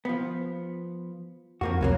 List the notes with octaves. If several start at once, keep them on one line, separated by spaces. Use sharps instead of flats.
F3 B3
F2 F3 A#3 F#4
C2 A2 F#3 A#3